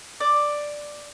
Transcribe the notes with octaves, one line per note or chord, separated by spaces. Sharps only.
D5